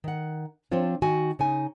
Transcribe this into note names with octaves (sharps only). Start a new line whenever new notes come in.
D#3 F#5
F3 C4 D4 F4 C#5
D#3 F#4 G#5
C#3 D#4 G#5